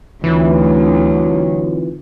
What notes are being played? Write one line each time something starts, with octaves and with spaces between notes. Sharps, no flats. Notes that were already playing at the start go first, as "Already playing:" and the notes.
D2 E3 F#3 C4 D#4 F4